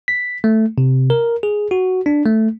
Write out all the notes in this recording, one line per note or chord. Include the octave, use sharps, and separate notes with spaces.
B6
A3
C3
A#4
G#4
F#4
D4
A3